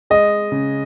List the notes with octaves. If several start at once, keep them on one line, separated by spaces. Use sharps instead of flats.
G#3 D#5
C#3